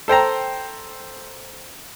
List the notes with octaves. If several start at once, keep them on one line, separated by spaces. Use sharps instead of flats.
A4 C5 G5 A#5